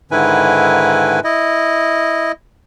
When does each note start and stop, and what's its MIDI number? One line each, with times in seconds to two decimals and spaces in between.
0.11 1.20 44
0.11 1.20 50
0.11 1.20 51
0.11 1.20 64
0.11 1.20 71
0.11 1.20 80
1.24 2.32 64
1.24 2.32 75